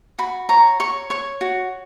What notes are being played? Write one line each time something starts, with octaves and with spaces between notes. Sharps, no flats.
F#4 B5
C#5 A#5
C#5 C#6
C#5 C#6
F#4